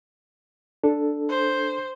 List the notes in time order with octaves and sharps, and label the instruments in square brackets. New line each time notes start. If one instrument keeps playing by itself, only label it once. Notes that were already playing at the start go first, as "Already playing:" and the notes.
[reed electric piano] D4 A4
[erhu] C5